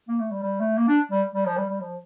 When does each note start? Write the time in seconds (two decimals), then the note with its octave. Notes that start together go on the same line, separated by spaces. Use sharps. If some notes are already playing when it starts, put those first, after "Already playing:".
0.08 A#3
0.20 A3
0.31 G3
0.43 G3
0.60 A3
0.78 A#3
0.88 D4
1.11 G3
1.35 G3
1.46 F3
1.58 G3
1.69 G3
1.80 F3